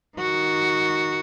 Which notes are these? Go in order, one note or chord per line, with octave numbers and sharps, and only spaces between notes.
D#3 F#4